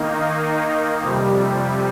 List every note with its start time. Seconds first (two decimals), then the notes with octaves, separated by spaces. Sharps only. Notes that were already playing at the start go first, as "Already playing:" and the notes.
Already playing: D#3 A#3 D#4
1.02 F2 C3 G3